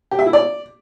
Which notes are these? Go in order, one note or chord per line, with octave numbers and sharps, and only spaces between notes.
G4
E5
E4
D5